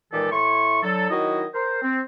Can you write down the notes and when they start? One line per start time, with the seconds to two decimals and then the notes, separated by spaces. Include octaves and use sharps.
0.12 A#2 D#3 E3 G#3 G4 A4
0.32 A2 E4 C6 C#6
0.83 D3 F#3 A4
1.10 D#3 F#3 E4 F#4 D#5
1.54 A#4 C5
1.82 C4